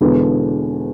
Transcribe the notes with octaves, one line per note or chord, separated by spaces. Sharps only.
E1 E2 D3